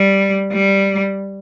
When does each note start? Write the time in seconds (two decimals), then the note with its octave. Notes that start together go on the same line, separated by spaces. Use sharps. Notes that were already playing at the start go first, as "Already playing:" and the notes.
Already playing: G3
0.52 G3